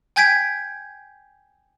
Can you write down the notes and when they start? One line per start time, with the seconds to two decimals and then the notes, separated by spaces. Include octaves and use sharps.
0.16 G5 G#5 G6 G#6 B6 D7